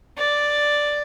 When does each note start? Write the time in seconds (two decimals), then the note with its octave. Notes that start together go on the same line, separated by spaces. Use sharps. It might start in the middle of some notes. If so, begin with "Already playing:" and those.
0.18 D5